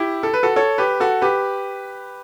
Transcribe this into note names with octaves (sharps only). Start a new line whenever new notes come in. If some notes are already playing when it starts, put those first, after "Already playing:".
Already playing: E4 G4
A4
B4
F#4 A4
A4 C#5
G4 B4
F#4 A4
G4 B4